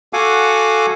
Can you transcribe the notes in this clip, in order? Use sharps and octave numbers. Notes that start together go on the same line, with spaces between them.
F#4 A4 F5 F#5 G#5 D6